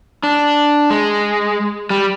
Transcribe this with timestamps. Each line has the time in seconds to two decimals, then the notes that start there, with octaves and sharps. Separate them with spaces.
0.23 D4
0.90 G#3
1.90 G3